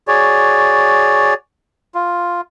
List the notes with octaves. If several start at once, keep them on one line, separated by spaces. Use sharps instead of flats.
F#4 G#4 C#5 D5
F4